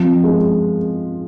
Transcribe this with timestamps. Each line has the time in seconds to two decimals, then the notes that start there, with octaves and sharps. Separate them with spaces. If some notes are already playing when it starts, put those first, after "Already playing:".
Already playing: F3 C4
0.24 G#3